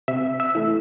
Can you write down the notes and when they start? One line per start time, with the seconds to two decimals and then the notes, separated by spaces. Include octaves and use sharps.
0.08 C3 E5
0.40 E5
0.55 E3 A3